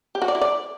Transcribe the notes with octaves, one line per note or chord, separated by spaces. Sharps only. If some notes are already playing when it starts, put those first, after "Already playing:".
G4
F#4
D5
E4
D5